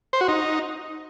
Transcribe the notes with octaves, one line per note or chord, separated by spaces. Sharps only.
C5
F#4
D#4